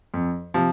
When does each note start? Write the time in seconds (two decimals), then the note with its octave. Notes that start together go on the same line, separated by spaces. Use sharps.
0.14 F2
0.54 C3 F3